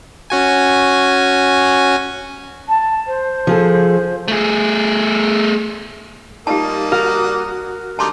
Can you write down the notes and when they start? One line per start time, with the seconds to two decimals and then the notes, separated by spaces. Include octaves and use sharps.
0.30 C#4 F#4 G#5
2.69 A5
3.07 C5
3.47 F3 G#4 A4
4.28 A3 G#4
6.47 G3 A#3 D#4 F4 G4 A5 D#6
6.92 F#4 A#4
7.99 D3 G3 D#4 A5 C6 D6